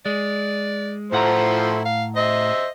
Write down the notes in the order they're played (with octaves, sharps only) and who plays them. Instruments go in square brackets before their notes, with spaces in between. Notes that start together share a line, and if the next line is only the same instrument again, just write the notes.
[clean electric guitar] G#3 [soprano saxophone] D5
[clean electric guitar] A2 F#5 A#5 [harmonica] F3 A3 C5 [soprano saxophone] E4
[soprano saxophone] F5
[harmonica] C5 E5 [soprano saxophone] D#5